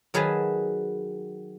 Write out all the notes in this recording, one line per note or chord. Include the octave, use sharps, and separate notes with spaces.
D#3 F#3 G#4 B4 G#5 A5